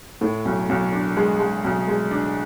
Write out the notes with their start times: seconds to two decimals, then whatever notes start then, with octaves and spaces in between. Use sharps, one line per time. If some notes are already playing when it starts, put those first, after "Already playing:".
0.21 A2
0.45 B1
0.69 B1
0.93 D4
1.17 G#3
1.40 G#3
1.64 B1
1.88 G#3
2.11 D4